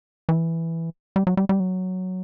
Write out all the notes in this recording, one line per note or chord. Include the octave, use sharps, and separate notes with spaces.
E3
G3
F#3
G3
G3
F#3